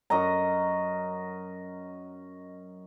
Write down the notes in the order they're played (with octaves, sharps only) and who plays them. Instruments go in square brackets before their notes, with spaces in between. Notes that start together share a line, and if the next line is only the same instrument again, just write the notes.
[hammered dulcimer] F#2 D#5 A#5